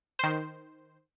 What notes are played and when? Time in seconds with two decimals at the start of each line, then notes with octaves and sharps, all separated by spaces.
0.19 D#3 C5